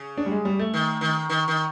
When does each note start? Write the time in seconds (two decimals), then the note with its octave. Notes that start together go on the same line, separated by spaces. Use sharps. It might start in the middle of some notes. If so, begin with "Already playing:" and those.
Already playing: C#3
0.17 D4
0.26 G3
0.31 G#3
0.45 G3
0.59 A3
0.73 D#3
1.01 D#3
1.29 D#3
1.48 D#3